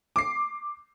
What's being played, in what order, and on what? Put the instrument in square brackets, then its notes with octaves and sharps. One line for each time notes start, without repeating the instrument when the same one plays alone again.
[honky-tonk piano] D6 C7